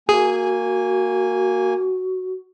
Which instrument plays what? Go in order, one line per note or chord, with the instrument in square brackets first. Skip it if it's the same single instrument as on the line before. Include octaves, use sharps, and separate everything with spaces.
[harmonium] A#3 G#5 [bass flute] F#4 [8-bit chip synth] G#4